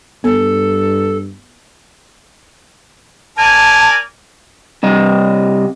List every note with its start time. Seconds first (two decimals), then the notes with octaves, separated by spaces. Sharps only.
0.24 G2 B3 A4
3.37 A#4 D5 G#5 A5
4.83 C3 G3 D#5